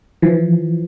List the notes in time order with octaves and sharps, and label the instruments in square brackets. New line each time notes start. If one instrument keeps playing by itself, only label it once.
[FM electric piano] E3 F3